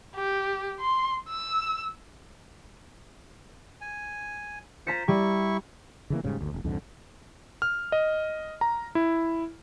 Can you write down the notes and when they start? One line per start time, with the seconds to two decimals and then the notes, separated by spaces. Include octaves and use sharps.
0.15 G4
0.80 C6
1.28 E6
3.81 G#5
4.87 F4 C5 A#5 B6 C#7
5.08 G3 E4 C#6
6.10 C#3 E3 A#3
6.23 E1 G#2 C#3 G3
6.37 G1 D2
6.53 E1
6.64 C2 F2 G#2 D3
7.62 F6
7.92 D#5
8.61 A#5
8.95 E4